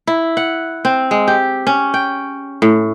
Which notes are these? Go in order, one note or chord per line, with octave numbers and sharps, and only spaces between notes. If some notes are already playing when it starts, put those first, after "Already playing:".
E4
F#5
C4
G#3
G4
C#4
G5
A2